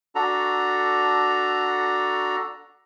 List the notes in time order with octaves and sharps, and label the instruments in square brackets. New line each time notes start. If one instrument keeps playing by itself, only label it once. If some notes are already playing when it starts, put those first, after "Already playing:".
[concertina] D4 F#4 A4 A#5